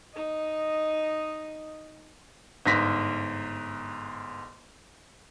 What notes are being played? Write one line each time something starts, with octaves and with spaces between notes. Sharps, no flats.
D#4 D#5
G1 G#2 A#6 B6